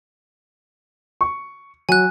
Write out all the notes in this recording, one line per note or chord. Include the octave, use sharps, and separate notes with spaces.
C#6
F#3 G#5 F#6